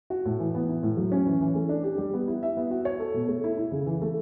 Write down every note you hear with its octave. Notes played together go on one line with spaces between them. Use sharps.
F#4
A2
E3
B3
E4
A2
F#3
C#4
E3
E3
A3
D4
G4
G3
B3
E4
E5
B3
F#4
C#5
A4
B2
A3
E4
E4
C#3
E3
A3